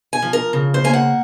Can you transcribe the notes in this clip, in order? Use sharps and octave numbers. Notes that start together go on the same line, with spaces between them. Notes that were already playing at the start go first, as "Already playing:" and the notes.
G#5
F3
A#4
C#3
C5
A#3 G#5
F#5